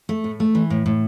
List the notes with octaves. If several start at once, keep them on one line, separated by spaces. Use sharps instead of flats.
A3
A2
A3
E3
A2
A2